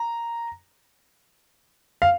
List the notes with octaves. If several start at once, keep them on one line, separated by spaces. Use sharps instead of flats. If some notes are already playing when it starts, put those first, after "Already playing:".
Already playing: A#5
F5